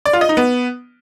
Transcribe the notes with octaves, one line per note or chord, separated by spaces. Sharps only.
D5
F4
D#5
D#4
B3